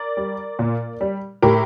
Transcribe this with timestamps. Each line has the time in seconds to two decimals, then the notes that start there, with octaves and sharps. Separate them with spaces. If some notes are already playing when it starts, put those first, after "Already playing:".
Already playing: A#4 D5
0.17 G3
0.59 A#2
1.01 G3
1.42 A2 G4 A#4